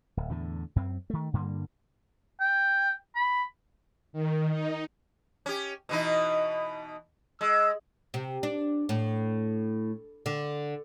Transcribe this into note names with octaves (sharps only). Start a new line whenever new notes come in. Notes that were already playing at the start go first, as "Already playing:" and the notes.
D1
E2 A2 D3
F#2 C4
D#3 A3
G2 D3 G3 A#3
G5
B5
D#3
D#4
C#4 G4
B2 E3 D#4
G#3 E6
C3
D4
A2
D3